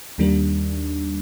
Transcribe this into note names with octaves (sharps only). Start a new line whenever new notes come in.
D#2 D#3 G3 A#3 D4